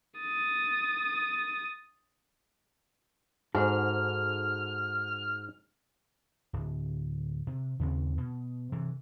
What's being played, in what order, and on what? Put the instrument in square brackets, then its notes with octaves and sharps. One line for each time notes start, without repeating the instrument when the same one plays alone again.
[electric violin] D#6 A6
[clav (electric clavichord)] G#2 [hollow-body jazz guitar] D#4 F#4 A4 [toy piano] C5 F#5 G#5 [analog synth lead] F6
[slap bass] D1
C3
D#2 C#3 C4
B2
C3 E3